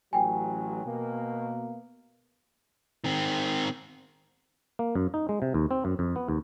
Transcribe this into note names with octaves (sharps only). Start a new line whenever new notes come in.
A1 F#3 G5 G#5
B2 A#3
D#3 C4
A#3
F#2
D#4
G#3
C3
D#2
C4
F#2
F2
B3
D#2